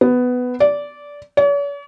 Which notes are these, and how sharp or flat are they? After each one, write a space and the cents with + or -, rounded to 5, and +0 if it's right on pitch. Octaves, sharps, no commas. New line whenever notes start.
B3 +10
D5 -15
C#5 +45